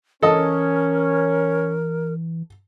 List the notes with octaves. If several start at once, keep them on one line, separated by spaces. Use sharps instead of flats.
E3 C#4 A4 A#4 D#5